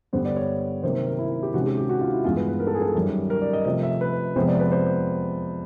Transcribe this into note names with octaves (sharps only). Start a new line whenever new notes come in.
G2 D3 G3 B3 C5
D5
C#5
C3 D#3 F#3 A#3 C5
C5
A#4
E4
G4
C3 D#3 G#3 C#4 F#4
G4
G4
F#4
F4
E4
G2 E3 G#3 B3 F4
B4
B4
A#4
A4
G#4
A4
F#2 D#3 G3
A#4
D5
D#5
C3 F3 A3 D#5
E5
B4
F2 C3 F3 G#3 B3 C5
D5
B4
C5